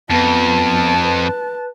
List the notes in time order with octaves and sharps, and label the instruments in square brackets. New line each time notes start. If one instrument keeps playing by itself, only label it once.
[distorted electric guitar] F2 [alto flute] B3 [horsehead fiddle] A5
[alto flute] B4